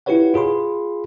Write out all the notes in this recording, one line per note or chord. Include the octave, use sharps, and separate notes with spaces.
E4 F4 G4 B4 C#5 F#5
F4 G#4 B5 C6